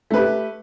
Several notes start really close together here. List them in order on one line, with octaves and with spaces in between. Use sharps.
A3 B4 G4